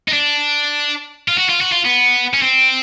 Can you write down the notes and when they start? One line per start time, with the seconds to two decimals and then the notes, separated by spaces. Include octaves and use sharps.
0.08 D#4
0.13 D4
1.28 F4
1.38 F#4
1.49 F4
1.61 F#4
1.72 F4
1.85 B3
2.33 C#4
2.42 C4